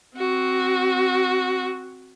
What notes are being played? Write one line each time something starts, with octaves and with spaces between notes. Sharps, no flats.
C4 F#4